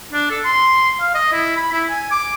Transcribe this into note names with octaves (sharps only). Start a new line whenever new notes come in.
D4
A4
C6
F5
D#5
E4
B5
E4
G#5
D6